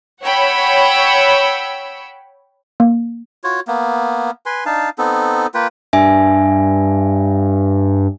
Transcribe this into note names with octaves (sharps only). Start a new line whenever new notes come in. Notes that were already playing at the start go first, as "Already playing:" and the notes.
C#5 F#5 G5 B5 E6
A#3
F4 F#4 C#5
A#3 B3
B4 G#5 C6
D4 D#4 F5 A5
B3 C4 D#4 A4
A#3 F4 B4 G5
G2 E5 G#5